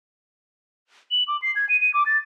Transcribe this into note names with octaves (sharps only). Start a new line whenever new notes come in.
F#7
D6
C7
G#6
D#7
D#7
D6
A6